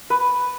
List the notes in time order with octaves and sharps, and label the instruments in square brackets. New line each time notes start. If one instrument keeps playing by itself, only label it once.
[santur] B4